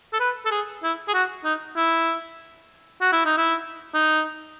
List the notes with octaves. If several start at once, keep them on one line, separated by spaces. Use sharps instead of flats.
A4
B4
A4
G#4
E4
G#4
F#4
D#4
E4
F#4
E4
D#4
E4
D#4